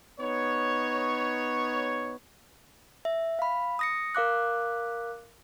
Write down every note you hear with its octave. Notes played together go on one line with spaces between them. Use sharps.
B3 D#4 C#5
E5
F5 B5
D#6 A#6 C#7
A#4 F5 D6 F#6